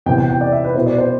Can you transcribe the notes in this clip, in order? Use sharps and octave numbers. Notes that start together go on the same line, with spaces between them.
E2 C3 E3 G5
G5
G5
D5
E5
B4
B2 B3 E4 C5
D5
C5